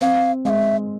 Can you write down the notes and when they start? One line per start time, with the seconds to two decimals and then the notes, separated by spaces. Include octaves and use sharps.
0.01 C4 F5
0.45 G#3 F5
0.49 E5